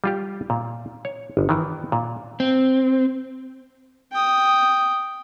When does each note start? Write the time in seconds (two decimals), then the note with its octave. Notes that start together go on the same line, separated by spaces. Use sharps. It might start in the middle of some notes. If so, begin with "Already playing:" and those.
0.04 G3 F4 G4
0.50 A#2
1.05 C#5
1.37 G1
1.49 D#3 E3
1.92 A#2
2.40 C4
4.12 G5 D#6